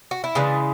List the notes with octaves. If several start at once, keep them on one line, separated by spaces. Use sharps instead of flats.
F#4
E4
C#3 E3 G#3 D4